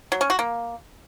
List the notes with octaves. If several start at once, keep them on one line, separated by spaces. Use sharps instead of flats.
F#3
C#4
F#4
A#3